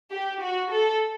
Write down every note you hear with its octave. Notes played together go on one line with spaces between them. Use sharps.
G4
F#4
A4